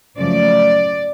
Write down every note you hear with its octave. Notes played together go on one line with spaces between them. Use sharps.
F#2 C#3 F3 A3 D5